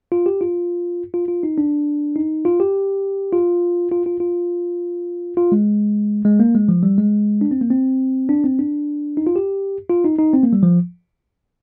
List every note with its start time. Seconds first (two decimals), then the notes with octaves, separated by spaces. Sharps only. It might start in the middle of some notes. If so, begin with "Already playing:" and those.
0.12 F4
0.26 G4
0.41 F4
1.14 F4
1.28 F4
1.43 D#4
1.58 D4
2.16 D#4
2.45 F4
2.60 G4
3.33 F4
3.91 F4
4.06 F4
4.20 F4
5.37 F4
5.52 G#3
6.25 G#3
6.40 A#3
6.54 G#3
6.69 F3
6.83 G3
6.98 G#3
7.41 D4
7.51 C4
7.61 A#3
7.71 C4
8.29 D4
8.44 C4
8.59 D4
9.17 D#4
9.27 F4
9.36 G4
9.90 F4
10.04 D#4
10.19 D#4
10.33 C4
10.43 A#3
10.53 G3
10.63 F3